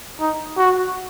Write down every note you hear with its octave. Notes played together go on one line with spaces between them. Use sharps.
D#4
F#4